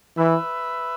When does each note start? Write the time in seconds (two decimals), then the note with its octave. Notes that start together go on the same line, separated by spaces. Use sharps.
0.18 E3 B4 E5